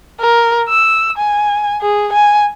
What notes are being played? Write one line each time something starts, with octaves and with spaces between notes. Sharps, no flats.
A#4
E6
G#5
G#4
G#5